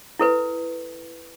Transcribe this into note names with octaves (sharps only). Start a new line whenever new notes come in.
E4 A4 B4